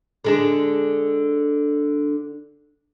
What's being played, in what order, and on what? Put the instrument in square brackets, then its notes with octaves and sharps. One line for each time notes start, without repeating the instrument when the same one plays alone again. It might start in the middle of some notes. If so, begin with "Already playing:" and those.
[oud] D3 G#3 D4